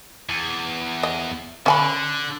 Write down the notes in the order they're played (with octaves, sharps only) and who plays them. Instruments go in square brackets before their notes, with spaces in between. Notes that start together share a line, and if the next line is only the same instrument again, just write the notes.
[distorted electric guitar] E2
[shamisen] D#5
[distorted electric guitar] D3 [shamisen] C#4 G#5 B5